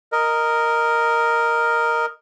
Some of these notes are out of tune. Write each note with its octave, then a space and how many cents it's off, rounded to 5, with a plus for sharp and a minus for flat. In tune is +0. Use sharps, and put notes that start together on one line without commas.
A#4 +0 D#5 +0